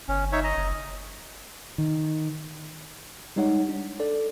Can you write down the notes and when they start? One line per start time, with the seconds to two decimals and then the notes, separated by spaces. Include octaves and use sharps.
0.08 G1 C#4
0.32 D#4 C#5 E5
0.44 D#5 A#5
0.57 F#1
1.78 D#3
3.36 G3 G#3 D#4 C#5 F#5
3.69 D4
4.00 A4 D5